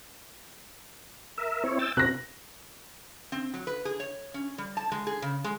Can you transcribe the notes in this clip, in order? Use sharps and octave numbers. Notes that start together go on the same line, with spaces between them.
A#4 E5
C4 E4 C#5
G5 E6 A6
C3 C4 F#4 F#6 A#6
C4
F#3
B4
G#4
C#5
C#4
G3
A5
G#3
G#4
C#3
G#3